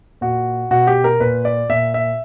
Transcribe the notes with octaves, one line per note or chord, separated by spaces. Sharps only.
A#2 F#4
B2 F#4
G4
A#4
A#2 B4
D5
A#2 E5
E5